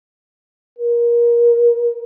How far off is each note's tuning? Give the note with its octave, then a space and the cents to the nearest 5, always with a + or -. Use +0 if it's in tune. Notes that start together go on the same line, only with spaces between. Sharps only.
A#4 +25